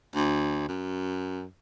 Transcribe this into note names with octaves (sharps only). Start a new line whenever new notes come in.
D2
F#2